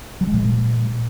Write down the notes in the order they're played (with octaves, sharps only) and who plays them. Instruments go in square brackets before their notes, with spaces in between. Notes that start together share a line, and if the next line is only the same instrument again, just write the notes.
[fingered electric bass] F#3
G#3
A#2